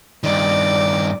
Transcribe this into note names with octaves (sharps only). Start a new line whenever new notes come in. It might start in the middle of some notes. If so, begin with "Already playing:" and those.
G2 D#3 D5